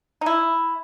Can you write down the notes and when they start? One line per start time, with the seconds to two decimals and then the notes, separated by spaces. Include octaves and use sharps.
0.21 D#4
0.26 E4